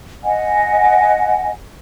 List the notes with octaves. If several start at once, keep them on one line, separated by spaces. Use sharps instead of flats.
D#5 F#5 G#5